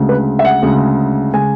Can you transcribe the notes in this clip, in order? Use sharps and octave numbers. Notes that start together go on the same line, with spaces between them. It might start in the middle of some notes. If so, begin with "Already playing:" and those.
Already playing: D2 C#3 G#3
B4
E5
F#5
D2 C#3 G#3
C#3 G#3 G#5